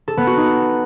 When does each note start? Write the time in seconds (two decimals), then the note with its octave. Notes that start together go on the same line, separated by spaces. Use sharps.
0.08 A4
0.17 B3
0.27 F#4
0.37 D#4